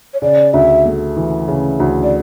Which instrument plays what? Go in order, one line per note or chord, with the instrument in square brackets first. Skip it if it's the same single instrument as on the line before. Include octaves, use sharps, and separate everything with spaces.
[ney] C#5
[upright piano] C#3 [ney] D5
[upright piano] D2 [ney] E5
[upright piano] A3
E3
C#3
D2
[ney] D5